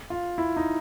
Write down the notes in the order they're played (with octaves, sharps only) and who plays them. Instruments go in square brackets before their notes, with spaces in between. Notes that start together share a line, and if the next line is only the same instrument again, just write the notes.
[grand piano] F4
E4
D#4